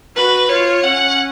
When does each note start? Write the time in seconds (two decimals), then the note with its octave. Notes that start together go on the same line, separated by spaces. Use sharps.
0.16 F#4 B4
0.50 F4 C#5
0.83 C#4 F#5